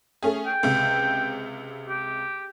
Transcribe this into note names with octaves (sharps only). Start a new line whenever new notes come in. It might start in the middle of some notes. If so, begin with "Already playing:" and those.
A3 C#4 G#4
G5
C#2 C3
G4